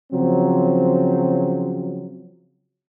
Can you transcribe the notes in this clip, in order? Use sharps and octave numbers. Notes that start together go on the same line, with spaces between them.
C#3 F3 F#3 C4